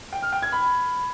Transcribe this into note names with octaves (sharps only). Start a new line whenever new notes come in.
G5
F6
G5
G#6
B5